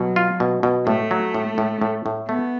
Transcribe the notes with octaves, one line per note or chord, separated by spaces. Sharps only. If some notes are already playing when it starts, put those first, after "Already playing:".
Already playing: B2 F#3
F4
B2
B2
A2 A3
F#3
A2
A2
A2
A2
A3 B3